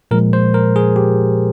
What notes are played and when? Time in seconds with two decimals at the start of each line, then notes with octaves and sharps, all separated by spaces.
0.11 A#2 F3 G#3 A#4
0.33 C5
0.54 A#4
0.76 G#4
0.96 G4